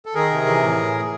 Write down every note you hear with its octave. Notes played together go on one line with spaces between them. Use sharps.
A4
D#3 G#4 A#4
C3
E3
A2